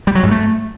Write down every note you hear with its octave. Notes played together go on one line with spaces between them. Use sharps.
G3
F#3
G#2
A3